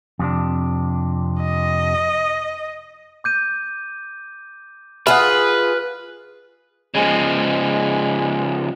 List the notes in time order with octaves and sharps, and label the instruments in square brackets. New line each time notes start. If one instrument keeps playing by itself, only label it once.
[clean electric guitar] F2 C3 D4
[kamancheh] D#5
[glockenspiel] D6 G6 D#7
[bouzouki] F4 G#4 [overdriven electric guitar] B4 [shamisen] E5 F#5 [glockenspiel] F6 F#6
[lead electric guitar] C#3 F3 [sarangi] G#3